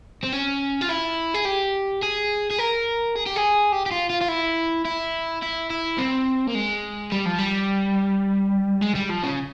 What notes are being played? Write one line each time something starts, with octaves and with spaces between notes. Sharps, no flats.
C4
C#4
F4
E4
G#4
G4
G#4
G#4
A#4
G#4
G4
G#4
G4
G4
F4
F4
F4
E4
E4
E4
E4
C4
A#3
G#3
G3
F3
G3
G#3
G3
F3
C#3